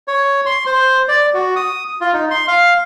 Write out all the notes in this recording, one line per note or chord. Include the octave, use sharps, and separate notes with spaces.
C#5
C6
C5
D5
F#4
D#6
F4
D#4
C6
F5